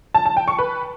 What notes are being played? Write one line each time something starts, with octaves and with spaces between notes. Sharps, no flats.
A5
A5
G5
C#6
B4